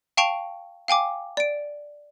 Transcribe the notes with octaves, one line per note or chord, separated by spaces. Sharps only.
F5 G5 A5 C#6 D7 F7
F5 G5 G#5 D6
D5 D7